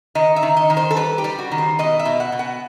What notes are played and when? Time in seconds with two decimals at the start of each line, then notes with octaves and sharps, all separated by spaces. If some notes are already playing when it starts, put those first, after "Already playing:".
0.15 D#3 D#5
0.36 E5
0.43 D#3
0.57 D#5
0.70 D#3
0.77 C5
0.91 A4
0.97 G3 B4
1.18 G4
1.24 G3
1.38 F#4
1.52 D#3
1.58 C5
1.79 B2 D#5
1.99 E5
2.05 B2
2.20 F#5
2.32 B2
2.39 F#5